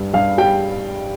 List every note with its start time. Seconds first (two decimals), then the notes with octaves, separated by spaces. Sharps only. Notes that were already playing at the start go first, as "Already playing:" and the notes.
Already playing: G2 G3
0.14 G2 F5
0.38 G3 G5